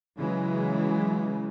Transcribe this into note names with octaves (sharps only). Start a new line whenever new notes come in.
C#3 E3 F#3 G#3